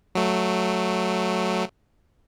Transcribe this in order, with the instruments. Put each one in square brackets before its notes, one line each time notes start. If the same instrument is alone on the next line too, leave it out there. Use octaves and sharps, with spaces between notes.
[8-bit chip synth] F#3 A3